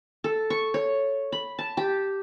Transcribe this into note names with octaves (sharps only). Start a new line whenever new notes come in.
A4
C#6
C#5
B5
A5
G4